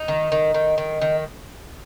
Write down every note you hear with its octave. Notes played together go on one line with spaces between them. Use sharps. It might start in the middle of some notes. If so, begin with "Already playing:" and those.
Already playing: D#4
D#3
D#3
D#3
D#3
D#3